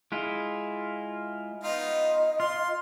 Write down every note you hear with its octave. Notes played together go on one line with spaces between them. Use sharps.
G#3 E4 F4
B3 D#4 F4 D#5
F4 C6